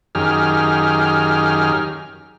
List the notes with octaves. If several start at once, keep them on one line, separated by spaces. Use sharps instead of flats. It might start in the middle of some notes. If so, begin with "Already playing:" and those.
F#2 D#3 G4 G#4 F6